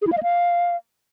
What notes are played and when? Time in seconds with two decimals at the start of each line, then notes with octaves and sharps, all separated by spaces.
0.02 G#4
0.07 E4
0.12 F5
0.18 D#5
0.23 F5